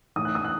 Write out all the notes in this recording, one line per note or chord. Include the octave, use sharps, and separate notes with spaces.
A2 E3 D#6
F#6
D#6
F#6